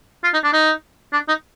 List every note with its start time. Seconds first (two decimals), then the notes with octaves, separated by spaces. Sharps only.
0.23 F4
0.33 D#4
0.43 D4
0.53 D#4
1.13 D4
1.28 D#4